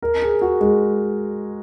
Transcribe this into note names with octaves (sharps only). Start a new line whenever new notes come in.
A#4
G#4
F#4
G#3